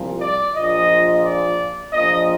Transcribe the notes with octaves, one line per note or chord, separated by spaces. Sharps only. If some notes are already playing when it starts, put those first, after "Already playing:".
Already playing: C2 A#2 F3
D5
A#1 A#2 F3 D#5
D5
A#1 A#2 F3 D#5